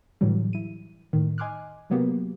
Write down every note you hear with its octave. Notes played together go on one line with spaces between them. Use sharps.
A2 D3 E3 F#3 G3
E4 D#7
A2 D#3
D#5 G#5 C6 D6 F6 F#6
C3 F#3 A#3 B3 F#4 G4